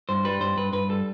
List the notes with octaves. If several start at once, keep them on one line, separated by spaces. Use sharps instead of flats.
G2 C5
G3 B4
G2 C5
G2 B4
G2 B4
G3 A4